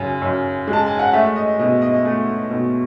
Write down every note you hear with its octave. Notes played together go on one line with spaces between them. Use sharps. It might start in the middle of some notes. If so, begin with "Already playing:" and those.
Already playing: F#2 C#3 G#5
F#2
G#3
A5
G#5
F#5
A3 E5
D#5
B2 D#5
D#5
A3
B2